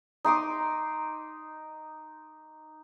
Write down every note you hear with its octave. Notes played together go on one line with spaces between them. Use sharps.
D#4 C6 D6 D#6